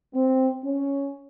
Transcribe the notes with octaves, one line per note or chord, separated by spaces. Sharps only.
C4
C#4